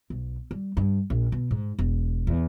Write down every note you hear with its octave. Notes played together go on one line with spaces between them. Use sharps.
B1
G3
G2
A#1
B2
G#2
E1
E2